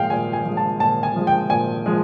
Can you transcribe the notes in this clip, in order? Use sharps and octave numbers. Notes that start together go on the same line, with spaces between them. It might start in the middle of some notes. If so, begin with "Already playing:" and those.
Already playing: A#2 F3 G#3 F5 G5
A#2 G#5
G#5
F3 G#3
A5
A#2 A5
G#5
F3 G#3
G5
A#2 G#5
F3 G#3